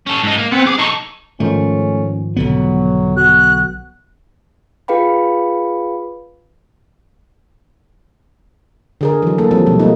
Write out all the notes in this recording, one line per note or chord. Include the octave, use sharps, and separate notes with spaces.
C#4 A4
G#2 D#4
A#3
B3 C4 F#5
G#4 D6
D#4 A4 C#6
G#2 D#3 F3 A3 C#4
B1 D3 F#3 B3
F#4 F#6
F4 G#4 B4 F5 G5 B5
D3 G#4 A#4
E3 F#3
A#3 A4
F3 G3 C4 A4
B2 F3 G3
A3 A#3 D#4